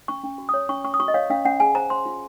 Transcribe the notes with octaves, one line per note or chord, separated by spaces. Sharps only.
C#4 C#6
C#4
F#4
D#6
C#5
C#4 C#6
C#4 C#6
D#6
F#4 C#6
D#5
C#5 F5
C#4 F5
C#4 F#5
G#4 G#5
C5 A#5
C5 C6
F4